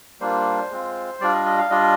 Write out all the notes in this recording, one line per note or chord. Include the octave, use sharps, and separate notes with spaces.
G3 A#3 D4 F4 C5
G#3 C4 F4
G3 D4 F4 D5
D#5
D#5
F5
G3 D4 F4 D#5